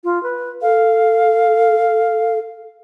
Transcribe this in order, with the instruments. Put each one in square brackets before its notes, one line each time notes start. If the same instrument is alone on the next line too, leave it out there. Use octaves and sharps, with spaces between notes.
[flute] F4
B4
[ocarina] A4 [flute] F5